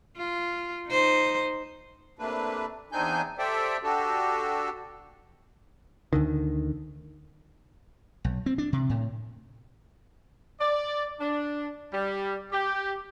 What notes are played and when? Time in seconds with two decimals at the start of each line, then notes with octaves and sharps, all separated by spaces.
0.18 F4
0.88 D#4 C5
2.19 C3 A3 A#3 D4 B4
2.92 E2 C4 D4 D#4 G#5 G6
3.39 G4 A4 C5 D5 E5 G5
3.83 D4 F#4 G4 A4
6.13 D2 D3 D#3
8.24 B1
8.46 C4
8.58 D4
8.73 C3
8.89 A2
10.60 D5
11.20 D4
11.93 G3
12.51 G4